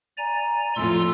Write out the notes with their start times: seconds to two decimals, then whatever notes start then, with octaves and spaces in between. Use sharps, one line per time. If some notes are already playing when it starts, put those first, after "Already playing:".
0.17 D5 G#5 A#5
0.75 F2 A2 F4 C6 E6